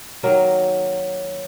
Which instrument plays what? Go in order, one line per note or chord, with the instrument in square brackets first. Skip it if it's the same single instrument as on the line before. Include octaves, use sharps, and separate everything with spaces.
[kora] D#3 F#3 A#3 A#4